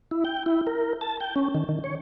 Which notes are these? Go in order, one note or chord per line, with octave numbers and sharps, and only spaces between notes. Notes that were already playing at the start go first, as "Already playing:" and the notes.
E4
G5
E4
A#4
A5
G5
C#4
D#3
D#3
C#5